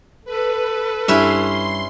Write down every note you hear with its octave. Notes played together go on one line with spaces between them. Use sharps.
A4 B4
G2 C#4 E4 B4 C6